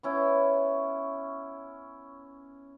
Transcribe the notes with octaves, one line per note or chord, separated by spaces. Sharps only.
B3 C#4 E4